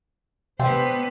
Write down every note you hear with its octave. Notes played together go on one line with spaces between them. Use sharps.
C3 B3 C4 D4 B4 C5 G5